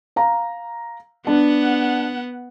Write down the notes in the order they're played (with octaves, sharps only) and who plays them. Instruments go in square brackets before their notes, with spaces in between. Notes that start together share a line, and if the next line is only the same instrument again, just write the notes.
[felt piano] F5 A#5
[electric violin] B3 F#5 [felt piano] D4